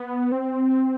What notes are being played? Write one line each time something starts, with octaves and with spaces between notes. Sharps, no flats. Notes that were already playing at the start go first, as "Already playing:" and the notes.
Already playing: B3
C4